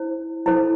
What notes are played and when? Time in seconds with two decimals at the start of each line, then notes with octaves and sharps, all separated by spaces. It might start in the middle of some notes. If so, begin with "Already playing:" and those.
Already playing: E4 C5
0.46 E4 A4 C5